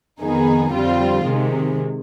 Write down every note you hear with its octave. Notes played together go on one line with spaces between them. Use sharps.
F2 D#3 B3 D#4 G#4
F2 D3 G3 C4 F4
C3 D#3 G#3